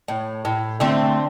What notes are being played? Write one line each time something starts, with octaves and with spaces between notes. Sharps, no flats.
A2
A2
D3 A3 C4